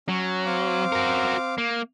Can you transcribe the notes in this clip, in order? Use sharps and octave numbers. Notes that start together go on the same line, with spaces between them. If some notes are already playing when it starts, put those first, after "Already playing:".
F#3 C#4
C4 F5 D6
F#4 A#4
A#3